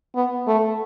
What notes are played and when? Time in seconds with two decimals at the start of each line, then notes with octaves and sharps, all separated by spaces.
0.15 B3
0.47 A3